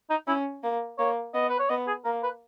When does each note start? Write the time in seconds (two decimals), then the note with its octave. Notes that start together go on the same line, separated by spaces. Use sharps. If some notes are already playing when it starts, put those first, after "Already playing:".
0.10 D#4
0.27 C#4 E4
0.63 A#3
0.98 A#3 C#5
1.34 B3 D#5
1.49 B4
1.59 C#5
1.69 B3 D#5
1.87 G#4
2.05 A#3 A#4
2.23 B4